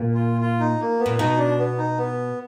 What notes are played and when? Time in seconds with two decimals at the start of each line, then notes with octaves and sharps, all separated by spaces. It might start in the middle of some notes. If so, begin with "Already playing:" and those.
Already playing: A#2
0.15 F4
0.41 F4
0.60 D#4
0.80 A#3
0.99 B3
1.06 A#2
1.18 B2 D#4
1.38 D4
1.59 B3
1.78 D#4
1.98 B3